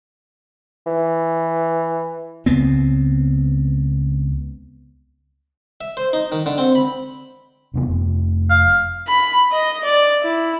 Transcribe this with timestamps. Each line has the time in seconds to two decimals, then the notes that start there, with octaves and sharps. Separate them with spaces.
0.87 E3
2.46 C#2 B3 C4
5.81 E5
5.97 C5
6.13 D#4
6.32 D#3
6.46 D3
6.58 C4
6.75 B5
7.74 D#1 C3 B3
7.87 F1
8.50 F5
9.07 B5
9.52 D#5
9.84 D5
10.22 E4